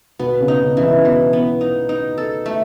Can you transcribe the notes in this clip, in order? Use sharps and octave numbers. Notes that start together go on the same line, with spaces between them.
B2 B3
C#3
D#4
C#3
E3
C#3
B2 E3
B3
D#4
D#4
A4
A3